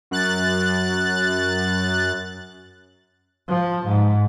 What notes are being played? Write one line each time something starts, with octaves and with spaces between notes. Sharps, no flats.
F#2 F#6 A6
F3
G#2